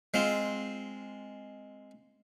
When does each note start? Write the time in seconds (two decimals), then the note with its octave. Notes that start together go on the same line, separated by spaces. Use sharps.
0.14 G#3 C4 F4